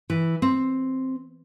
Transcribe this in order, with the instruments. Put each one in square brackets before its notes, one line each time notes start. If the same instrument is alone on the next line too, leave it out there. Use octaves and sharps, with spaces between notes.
[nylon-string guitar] E3
C4